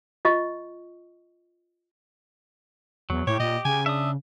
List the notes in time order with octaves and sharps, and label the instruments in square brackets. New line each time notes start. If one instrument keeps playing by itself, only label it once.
[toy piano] F4 D#5 C#6
[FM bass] E2 [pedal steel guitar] F#3
[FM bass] A2 [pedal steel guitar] G4 [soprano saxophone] C#5
[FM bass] A#2 [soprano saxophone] D#5
[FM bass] C#3 [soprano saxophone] G#5
[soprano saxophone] D4 [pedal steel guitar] E5 D#6